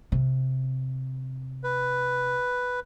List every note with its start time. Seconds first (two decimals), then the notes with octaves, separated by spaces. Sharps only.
0.12 C3
1.64 B4